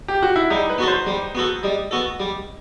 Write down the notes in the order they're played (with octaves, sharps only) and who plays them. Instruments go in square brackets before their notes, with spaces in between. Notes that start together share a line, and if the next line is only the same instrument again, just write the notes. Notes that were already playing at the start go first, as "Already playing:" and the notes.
[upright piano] G4
F#4
E4
[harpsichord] G3 [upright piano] D#4
[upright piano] B4
[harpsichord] B3 F#4 A4
[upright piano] C5
[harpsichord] G3
B3 F#4 A4
[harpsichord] G3 [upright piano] D#5
[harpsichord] B3 F#4 A4
G3